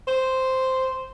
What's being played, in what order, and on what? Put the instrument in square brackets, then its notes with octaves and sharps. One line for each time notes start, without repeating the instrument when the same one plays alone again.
[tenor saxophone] C5